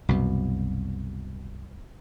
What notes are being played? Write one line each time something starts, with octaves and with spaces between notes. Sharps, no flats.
C2 F#2 B2